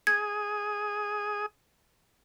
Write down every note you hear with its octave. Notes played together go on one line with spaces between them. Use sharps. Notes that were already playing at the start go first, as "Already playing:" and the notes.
G#4 D#6 G#6